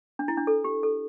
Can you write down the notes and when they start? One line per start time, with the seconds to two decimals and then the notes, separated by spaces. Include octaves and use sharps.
0.19 D4
0.28 E4
0.37 D4
0.47 A4
0.64 G4
0.83 A4